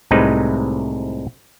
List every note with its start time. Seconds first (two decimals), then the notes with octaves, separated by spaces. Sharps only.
0.11 C2 A2 C3 G#3 D#4 B4